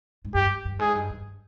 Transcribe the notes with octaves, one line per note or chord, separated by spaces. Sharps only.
G#2
G2 G4
G2
G#2 G#4
G2
G2